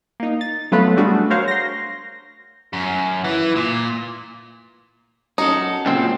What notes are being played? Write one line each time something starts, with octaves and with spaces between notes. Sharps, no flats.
A#3 D#4
A6
F#3 A3 B3 F4 B4
G3 A3 D4 F#4 G#4
F#4 A#4 C5 C#5 F5
C6 A#6
F#2
E3
A#2
F#2 C#4 D#4 F#4 A4
C#2 A#2 C4